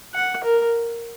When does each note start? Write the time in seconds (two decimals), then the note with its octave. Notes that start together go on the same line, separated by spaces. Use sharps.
0.14 F#5
0.44 A#4